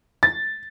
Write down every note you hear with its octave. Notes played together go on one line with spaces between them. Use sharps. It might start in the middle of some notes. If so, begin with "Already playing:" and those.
A6